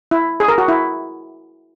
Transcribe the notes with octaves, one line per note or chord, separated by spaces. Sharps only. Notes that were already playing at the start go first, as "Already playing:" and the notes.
E4
G#4
A#4
F#4
E4